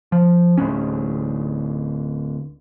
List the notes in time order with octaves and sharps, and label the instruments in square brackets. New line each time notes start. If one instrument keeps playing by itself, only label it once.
[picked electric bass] F3
D1 D2 C#4